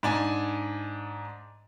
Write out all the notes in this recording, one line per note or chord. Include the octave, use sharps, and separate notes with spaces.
G#2 D4 G#5